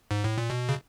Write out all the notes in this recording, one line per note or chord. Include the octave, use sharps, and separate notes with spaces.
G#2
A2
A#2
B2
C#3